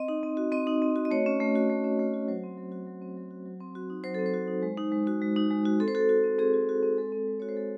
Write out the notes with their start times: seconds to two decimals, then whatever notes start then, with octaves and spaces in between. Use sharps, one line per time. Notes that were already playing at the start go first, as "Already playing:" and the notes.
Already playing: C4 D#5
0.08 D#4
0.23 C4
0.37 F#4
0.52 C4 D#5
0.67 D#4
0.82 C4
0.96 F#4
1.05 D#5
1.11 A3 C#5
1.26 C#4
1.40 A3
1.56 F#4
1.70 A3
1.84 C#4
1.99 A3
2.14 F#4
2.28 F#3 C5
2.43 C4
2.58 F#3
2.72 F#4
2.87 F#3
3.02 C4
3.17 F#3
3.31 F#4
3.46 F#3
3.60 C4
3.75 F#4
3.90 D#4
4.04 F#3 C5
4.14 C4 A4
4.26 C5
4.34 F#4
4.48 D#4
4.63 G#3
4.77 D#4
4.92 G#3
5.07 F#4
5.21 G#3
5.36 D#4
5.50 G#3
5.65 F#4
5.80 C4 A4
5.88 C5
5.95 F#4 A4
6.09 F#4
6.24 C4
6.39 C4 G#4
6.54 F#4
6.69 F#4
6.83 C4
6.98 G#3 A4
7.12 C4
7.27 G#3
7.40 F#4 C#5
7.49 C5
7.57 G#3 A4